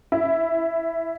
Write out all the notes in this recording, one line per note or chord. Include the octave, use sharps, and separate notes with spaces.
E4